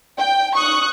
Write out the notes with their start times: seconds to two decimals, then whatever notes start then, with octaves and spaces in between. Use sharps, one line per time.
0.18 G5
0.55 C#6 D#6 F#6